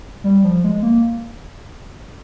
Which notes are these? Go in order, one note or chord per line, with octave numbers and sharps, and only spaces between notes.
G3
F3
G#3
A#3